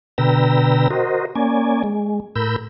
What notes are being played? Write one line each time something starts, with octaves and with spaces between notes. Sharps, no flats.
B2 D3 B4 G5 A#5 E6
F#4 A#4 C5 D#5
A#3 C#4 D5 G#5
G#3
A2 A#4 B5 E6 G6